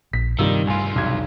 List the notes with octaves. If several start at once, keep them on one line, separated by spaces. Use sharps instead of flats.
A#1 B6
G2 C3 D#3 G3 F4 E6
C2 F4 G#5
E1 B1 G#6